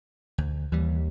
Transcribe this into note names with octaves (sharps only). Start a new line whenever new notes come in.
D2
D#2 E3 G3